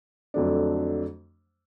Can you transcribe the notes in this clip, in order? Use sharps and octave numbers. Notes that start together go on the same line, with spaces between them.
F2 D3 F#3 A3 D4